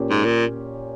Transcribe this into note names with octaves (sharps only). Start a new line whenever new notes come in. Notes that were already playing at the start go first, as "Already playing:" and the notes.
Already playing: A#2 A#3 C#4 G4 C#5
G#2
A#2